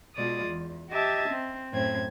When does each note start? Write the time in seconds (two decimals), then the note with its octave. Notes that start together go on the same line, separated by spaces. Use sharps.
0.16 B2 G#3 F4 D5 D#6
0.47 E2
0.90 G4 D#5 E5 A5 G#6
1.30 C4
1.73 F#2 A2 C4 G#6